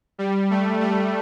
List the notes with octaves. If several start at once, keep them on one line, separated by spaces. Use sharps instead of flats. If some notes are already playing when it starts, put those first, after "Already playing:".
G3
A3
A3